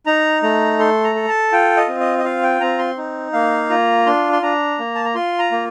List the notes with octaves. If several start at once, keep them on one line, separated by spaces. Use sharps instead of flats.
D#4 A#5
A3 A#5
A4 C6
A#5
A4
A5
F4 G5
D#5
C4
D#5
D#5
F4 F5
G5
C4 A#5
C6
D#4
A#3 F5
F4 A#5
D4 C6
C6
D4 A#5
A#3
A5
A#5
F4 C6
A#5
A#3